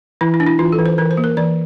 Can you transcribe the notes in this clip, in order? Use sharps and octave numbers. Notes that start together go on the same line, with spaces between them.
E3 E4
E4
D4
E4
E3 F4
A4
E3
C5
E3 A#4
C5
A#3
A#4
E3 D5